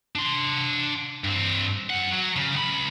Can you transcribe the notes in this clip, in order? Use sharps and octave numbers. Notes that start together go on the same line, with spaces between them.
D4 C6
G2 C4
F#2 F#5
F#3
C#3
C#2 B5